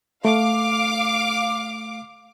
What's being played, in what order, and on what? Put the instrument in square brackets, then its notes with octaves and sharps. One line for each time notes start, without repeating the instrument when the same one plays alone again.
[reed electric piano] A3 [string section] F5 D6